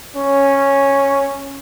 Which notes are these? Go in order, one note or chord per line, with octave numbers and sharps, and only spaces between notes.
C#4